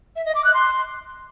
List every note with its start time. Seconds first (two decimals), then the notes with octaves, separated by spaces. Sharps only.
0.16 E5
0.26 D#5
0.35 D6
0.45 F#6
0.54 C6